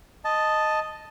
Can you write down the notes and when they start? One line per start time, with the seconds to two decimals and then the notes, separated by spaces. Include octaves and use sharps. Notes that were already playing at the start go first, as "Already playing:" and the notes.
0.25 D#5 A5